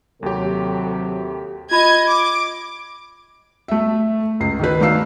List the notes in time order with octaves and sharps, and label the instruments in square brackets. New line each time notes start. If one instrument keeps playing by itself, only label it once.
[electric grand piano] D#2 G4 [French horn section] C3 F#3 A4
[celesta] F4 B5 [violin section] D#5 G#6
[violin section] D6
[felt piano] A3 E5
C#2 C7
D#3 A4 B4
A3 D#4 D5 F5 E6 C7